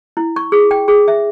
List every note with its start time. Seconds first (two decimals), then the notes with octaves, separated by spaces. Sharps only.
0.17 E4
0.36 C#6
0.52 G#4
0.71 G5
0.88 G#4
1.08 E5